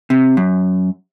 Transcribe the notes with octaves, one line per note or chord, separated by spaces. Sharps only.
C3
F#2